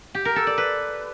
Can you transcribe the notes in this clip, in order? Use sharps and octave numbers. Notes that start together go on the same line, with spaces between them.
G4
A#4
A4
D5
B4